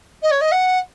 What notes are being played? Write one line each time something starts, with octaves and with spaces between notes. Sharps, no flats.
D#5
C#5
D#5
F#5